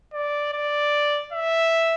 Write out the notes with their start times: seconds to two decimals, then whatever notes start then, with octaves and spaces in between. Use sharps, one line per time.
0.13 D5
0.53 D5
1.33 E5